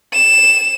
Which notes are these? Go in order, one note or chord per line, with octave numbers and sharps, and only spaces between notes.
E7